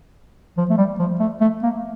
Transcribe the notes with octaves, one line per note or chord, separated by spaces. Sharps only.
F3
A3
G3
F3
A3
A3
A#3